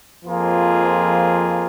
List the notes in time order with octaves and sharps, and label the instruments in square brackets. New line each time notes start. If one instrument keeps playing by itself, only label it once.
[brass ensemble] F2 F3 A#3 F4 G#4